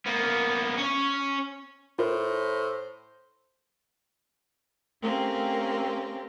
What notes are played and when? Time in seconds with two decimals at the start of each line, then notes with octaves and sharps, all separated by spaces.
0.06 A#3 B3
0.78 C#4 C#5
1.99 A2 F4 A#4 C5
5.02 A3 A#3 C4 C#4 G4